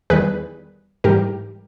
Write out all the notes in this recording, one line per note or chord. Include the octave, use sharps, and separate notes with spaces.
E2 D#3 G3 G#4 B4
G#2 E3 G3 G4 A#4